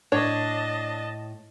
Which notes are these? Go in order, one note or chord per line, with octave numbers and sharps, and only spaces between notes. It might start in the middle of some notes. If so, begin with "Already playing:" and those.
A2 D4 C#5 D#5 A5